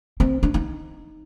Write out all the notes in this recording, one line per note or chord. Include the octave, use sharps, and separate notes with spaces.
C4
D4
D#4